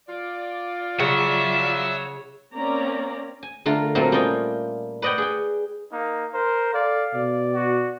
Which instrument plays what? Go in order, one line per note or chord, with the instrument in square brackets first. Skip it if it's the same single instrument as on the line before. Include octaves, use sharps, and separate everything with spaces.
[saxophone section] F4 D5
[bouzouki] C#3 [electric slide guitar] C#5 F#5 [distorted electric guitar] E5
[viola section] A#3 C4 C#4 D5 A#5
[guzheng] G#5
D3 A3 F4 A#4
A#2 F#3 A3 A#3 C4 F4
G3 C#4 F4 D#5 G5
B4 D5 D#5 F#5 G5
G#4 G5
[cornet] A#3 [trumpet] D#4
[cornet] A#4 [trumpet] C5
[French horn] A4 [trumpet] D5 [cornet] F5
[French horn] B2 [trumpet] D5
[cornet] F#4